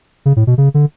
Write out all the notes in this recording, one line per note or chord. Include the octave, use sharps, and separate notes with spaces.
C#3
A2
B2
C#3
D3